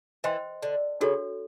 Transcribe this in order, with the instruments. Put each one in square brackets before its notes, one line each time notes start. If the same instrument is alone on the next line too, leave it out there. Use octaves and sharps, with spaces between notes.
[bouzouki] E3 [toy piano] C5 D#5 G5 C6
[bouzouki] D3
[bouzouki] C#3 [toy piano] D4 F#4 A4 C#5